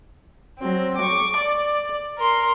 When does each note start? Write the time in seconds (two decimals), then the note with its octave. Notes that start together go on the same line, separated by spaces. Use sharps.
0.60 F#3 C4
0.97 C#6 D6
1.37 D5
2.18 A#4 C6